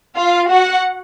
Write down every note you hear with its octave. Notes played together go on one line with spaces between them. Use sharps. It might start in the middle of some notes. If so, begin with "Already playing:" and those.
F4 F5
F#4 F#5